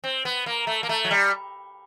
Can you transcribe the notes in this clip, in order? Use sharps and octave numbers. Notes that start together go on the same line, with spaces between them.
C4
B3
A#3
A3
A#3
A3
F#3
G3